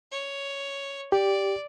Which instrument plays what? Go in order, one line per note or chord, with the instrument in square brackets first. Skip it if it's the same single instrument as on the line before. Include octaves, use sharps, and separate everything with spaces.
[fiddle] C#5
[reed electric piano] G4 [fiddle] D5